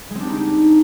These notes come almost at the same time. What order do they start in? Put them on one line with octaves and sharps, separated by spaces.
G#3 C4 D4 G4 D#4